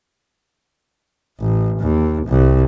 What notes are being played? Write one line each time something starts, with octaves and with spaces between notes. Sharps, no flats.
A1
D#2
C2